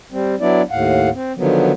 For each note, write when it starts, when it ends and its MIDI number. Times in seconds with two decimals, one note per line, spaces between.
0.12 0.35 55
0.12 0.35 60
0.40 0.62 54
0.40 0.62 59
0.40 0.62 62
0.40 0.62 64
0.40 0.62 74
0.71 1.09 39
0.71 1.09 45
0.71 1.09 77
0.71 1.09 78
1.14 1.33 60
1.37 1.72 50
1.37 1.72 51
1.37 1.72 53
1.37 1.72 54
1.37 1.72 59